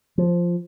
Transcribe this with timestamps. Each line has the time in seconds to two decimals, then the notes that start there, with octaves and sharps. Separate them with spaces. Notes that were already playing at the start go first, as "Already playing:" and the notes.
0.18 F3